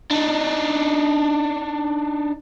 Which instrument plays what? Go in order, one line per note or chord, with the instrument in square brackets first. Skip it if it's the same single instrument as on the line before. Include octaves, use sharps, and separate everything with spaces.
[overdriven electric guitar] D4 D#4